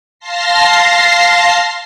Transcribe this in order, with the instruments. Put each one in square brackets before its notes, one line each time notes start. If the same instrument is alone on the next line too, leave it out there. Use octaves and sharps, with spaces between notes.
[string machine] F5 A5 C6 A#6 C7